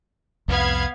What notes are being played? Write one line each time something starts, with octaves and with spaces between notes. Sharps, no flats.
C2 F2 B3 F5 G#6